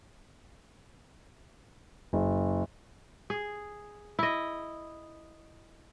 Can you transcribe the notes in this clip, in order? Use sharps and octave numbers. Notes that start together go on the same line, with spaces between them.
F#1
G#4
E4 D#5